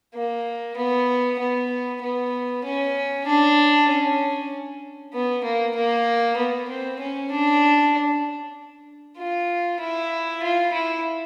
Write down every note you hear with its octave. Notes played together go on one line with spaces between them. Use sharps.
A#3
B3
B3
B3
C#4
D4
C#4
B3
A#3
A#3
B3
C4
C#4
D4
F4
E4
F4
E4